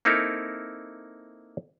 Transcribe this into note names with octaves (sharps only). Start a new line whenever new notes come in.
A#3 C4 D#4 E4 A4 A#4